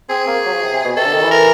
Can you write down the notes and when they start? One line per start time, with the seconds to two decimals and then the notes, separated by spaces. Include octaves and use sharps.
0.09 C4 G#4
0.27 A#3
0.45 F#3
0.53 F3
0.62 C3
0.73 C3
0.84 B2
0.97 C3 A4
1.05 D3
1.14 D#3
1.23 E3
1.31 A#4